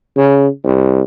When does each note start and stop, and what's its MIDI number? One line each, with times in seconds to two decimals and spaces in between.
0.17 0.48 49
0.65 1.01 36